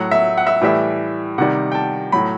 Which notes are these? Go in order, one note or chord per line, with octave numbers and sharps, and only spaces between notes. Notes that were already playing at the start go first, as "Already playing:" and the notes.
Already playing: A2 F#3 F#5
E5
F#5
E5
A2 E3 G3 E5
C3 D#3 G3 F#5
G5
A5
A2 F#3 B5